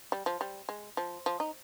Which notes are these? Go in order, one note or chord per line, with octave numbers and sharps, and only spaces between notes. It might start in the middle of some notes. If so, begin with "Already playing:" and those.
G3
F3
G3
G#3
F3
F3
D#4